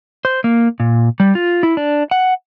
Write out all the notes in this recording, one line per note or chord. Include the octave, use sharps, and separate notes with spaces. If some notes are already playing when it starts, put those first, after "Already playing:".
C5
A#3
A#2
G3
F4
E4
D4
F#5